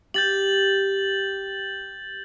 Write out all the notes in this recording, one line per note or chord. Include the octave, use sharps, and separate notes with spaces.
G4 G6 A6 F#7